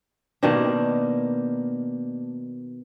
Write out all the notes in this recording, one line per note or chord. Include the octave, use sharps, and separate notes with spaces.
B2 D#3 A#3 D4